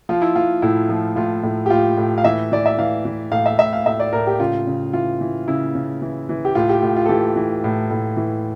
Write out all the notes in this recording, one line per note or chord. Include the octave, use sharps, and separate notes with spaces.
F3 F4
E4
F3 F4
A2 E4
F3
A2 F4
A2
G4
A2 F4
A2
F5
E3 E5
E3 D5
E5
E3 F5
E3
A2 F5
E5
A2 E5
F5
A2 E5
D5
A2 A#4
G4
C#3 F4
C#3
E3 F4
E3
C#3 E4
C#3
E3
E3
G4
A2 F4
G4
A2 F4
F4
A4
E3 G4
E3
A2
A2
E3